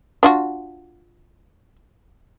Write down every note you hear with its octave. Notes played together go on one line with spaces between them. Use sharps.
D4 F4 F#4